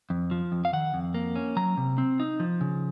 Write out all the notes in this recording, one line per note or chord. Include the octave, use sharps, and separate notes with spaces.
F2
F3
F2
F5
D#3 F#5
F2
A#3
C#4
F#3 A#5
C3
C4
D#4
F3
C#3